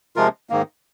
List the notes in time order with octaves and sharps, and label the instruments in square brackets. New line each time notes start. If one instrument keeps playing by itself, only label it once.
[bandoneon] C3 F3 G#3 F4 A#4
G#2 D#3 A#3